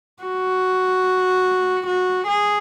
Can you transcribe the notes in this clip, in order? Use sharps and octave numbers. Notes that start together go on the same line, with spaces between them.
F#4
F#4
G#4